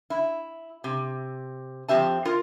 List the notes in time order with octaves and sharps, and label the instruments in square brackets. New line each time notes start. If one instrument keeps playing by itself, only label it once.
[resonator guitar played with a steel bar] E4
C3
F2 C4 G4 E5 A5
F4 A#4